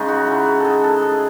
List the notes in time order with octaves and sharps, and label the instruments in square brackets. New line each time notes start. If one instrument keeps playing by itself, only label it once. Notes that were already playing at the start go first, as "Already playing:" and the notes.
Already playing: [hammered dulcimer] C#3 G#3 D#4 C#5
F#4
E4
F#4
G#4 A4
A4
G#4